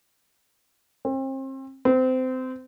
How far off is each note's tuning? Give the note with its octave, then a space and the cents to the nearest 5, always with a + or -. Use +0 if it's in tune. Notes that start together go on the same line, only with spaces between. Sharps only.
C4 +35
C4 -25